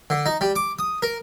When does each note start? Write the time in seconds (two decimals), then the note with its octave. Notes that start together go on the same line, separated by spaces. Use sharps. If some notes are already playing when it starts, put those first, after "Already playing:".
0.10 D3
0.26 D#4
0.41 G3
0.56 D6
0.79 D#6
1.02 A#4